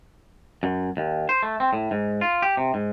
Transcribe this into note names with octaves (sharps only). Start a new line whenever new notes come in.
F#2
D#2
C5
A3
C4
A2
G#2
F4
G4
C3
G#2